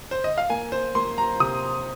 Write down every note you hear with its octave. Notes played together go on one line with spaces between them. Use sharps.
C5
D#5
F5
A#3 G#5
C5
A#3 C6
A#5
C3 D#6